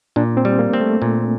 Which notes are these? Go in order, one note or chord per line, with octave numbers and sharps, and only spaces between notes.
A#2 D4
C4
G3
A#3
C4
A3
A#2